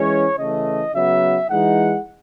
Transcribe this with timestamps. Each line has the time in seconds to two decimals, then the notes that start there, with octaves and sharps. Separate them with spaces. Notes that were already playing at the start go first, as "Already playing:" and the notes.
Already playing: E3 G#3 C#4 C#5
0.37 C#3 E3 A3 D#5
0.93 C#3 F#3 B3 E5
1.49 E3 G#3 D#4 F#5